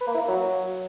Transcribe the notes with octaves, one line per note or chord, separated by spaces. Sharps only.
B4
A#3
E4
A#3
F#3